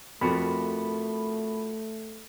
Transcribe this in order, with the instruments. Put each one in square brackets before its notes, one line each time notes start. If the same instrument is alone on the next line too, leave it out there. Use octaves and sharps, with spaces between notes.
[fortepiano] F2 [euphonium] A3 [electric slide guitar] F4 F#4 A#4 [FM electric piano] B5